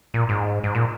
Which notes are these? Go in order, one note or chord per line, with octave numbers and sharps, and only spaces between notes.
A#2
G#2
G#2
A#2